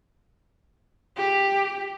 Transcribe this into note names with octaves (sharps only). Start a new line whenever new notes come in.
G4